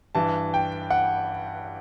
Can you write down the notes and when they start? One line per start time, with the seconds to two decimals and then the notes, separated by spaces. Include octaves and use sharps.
0.15 G2 E3 A5
0.54 G5
0.90 F#5